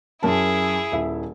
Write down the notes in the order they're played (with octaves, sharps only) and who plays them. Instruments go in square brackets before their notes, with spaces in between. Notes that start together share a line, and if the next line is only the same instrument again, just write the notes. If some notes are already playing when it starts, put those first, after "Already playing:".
[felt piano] F#2 A#4 A5 [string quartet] E4 G#4
[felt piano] D#1 E4 E5